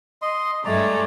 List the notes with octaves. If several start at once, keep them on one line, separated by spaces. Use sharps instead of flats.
D#5 C6
G2 G#3 A3 D5 A#5